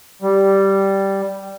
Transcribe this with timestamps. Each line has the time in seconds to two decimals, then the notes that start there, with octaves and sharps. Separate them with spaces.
0.22 G3